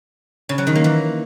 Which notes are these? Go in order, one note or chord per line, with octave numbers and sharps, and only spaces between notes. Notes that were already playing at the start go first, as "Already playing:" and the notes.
C#3
F#3
D#3
A#3
E3